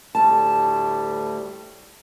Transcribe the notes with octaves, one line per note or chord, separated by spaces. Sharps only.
D2 A2 G3 A5